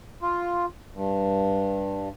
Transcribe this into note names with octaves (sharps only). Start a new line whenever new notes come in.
F4
G2